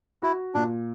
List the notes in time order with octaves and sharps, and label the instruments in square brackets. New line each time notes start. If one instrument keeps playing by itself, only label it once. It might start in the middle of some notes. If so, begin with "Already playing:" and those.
[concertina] E4 [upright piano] F#4
[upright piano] A#2 [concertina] D4